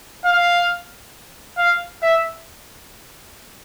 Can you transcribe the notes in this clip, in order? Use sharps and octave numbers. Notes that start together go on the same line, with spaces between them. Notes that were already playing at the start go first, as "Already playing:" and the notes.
F5
F5
E5